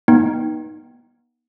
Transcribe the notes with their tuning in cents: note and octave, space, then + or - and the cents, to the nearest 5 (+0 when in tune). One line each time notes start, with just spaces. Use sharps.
B3 -35 D#4 +0 G5 -10